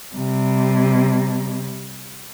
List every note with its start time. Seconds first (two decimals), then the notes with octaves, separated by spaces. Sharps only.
0.15 C3 G3